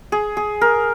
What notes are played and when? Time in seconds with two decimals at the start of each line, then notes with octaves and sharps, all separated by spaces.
0.12 G#4
0.37 G#4
0.61 A#4